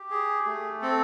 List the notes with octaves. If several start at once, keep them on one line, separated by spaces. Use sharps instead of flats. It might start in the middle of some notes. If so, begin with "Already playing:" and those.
Already playing: G4
G#4
A3
C4 A4